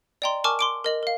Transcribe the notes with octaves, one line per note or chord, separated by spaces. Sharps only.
D5 D#5 G5 A#5 C6
A#4 G#5 A5 C#6 D6 F6
C6 D6 D7
A#4 D#5 F#7
A#4 F5